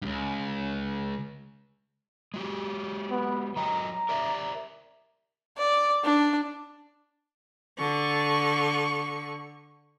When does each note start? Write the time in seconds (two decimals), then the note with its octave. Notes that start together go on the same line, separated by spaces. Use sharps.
0.02 C#2 G2
2.34 G#3 F#4 G4
3.11 B3
3.56 F#3 D#5 G5 A#5
4.09 A#4 D5 E5
5.58 D5
6.04 D4
7.78 D3 C#6